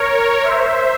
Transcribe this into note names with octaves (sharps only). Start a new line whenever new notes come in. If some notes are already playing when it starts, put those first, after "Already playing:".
Already playing: A#4 C#5
C5 E5